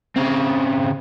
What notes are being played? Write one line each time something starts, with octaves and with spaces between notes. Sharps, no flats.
C#3 C4